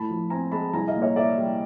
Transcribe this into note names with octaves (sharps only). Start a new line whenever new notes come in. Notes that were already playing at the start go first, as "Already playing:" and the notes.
Already playing: A2 A5 B5
F3
C4 G#5 A#5
G#3 A5 B5
C2 G#5 A#5
D#5 F5
A#2
C#5 D#5
A#3 D5 E5
G3